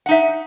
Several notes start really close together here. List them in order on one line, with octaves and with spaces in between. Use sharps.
F#5 D#4 E5